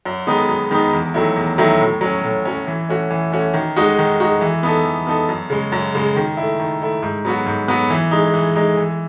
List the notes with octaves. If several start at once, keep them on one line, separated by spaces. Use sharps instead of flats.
F#2
D#3 G#3 B3 D#4
F#2
D#3 G#3 B3 D#4
E2
D#3 F#3 A3 E4
E2
D#3 F#3 A3 E4
A2
F#3 C#4
A2
F#3 C#4
E3
A3 C#4 F#4
E3
A3 C#4 F#4
D#3
G#3 D#4 F#4
D#3
G#3 D#4 F#4
E3
B3 D#4 A4
E3
B3 D#4 A4
F#2
C#3 G#3
F#2
C#3 G#3
D#3
A3 E4
D#3
A3 E4
G#2
F#3 B3 F#4
G#2
F#3 B3 F#4
E3
G#3 D#4
E3
G#3 D#4
E3